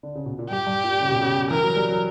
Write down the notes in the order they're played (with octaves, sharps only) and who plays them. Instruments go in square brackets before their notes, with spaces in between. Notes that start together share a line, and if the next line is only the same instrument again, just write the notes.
[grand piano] D3
C#3
B2
A#2
[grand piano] G2 [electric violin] G4
[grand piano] G2
A#2
C#3
B2
C#3
[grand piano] E3 [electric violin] A#4
[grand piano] F#3
G3
F#3